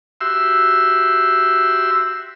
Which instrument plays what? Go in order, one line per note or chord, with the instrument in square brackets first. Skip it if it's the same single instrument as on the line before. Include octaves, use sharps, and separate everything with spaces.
[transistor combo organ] F#4 G4 E5 C6 E6